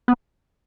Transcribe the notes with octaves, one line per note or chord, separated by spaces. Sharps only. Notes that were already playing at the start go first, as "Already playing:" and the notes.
B3